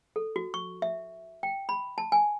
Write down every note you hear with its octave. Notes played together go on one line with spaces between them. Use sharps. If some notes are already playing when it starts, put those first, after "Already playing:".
A4
F#4
C#6
E5
G5
B5
A5
G#5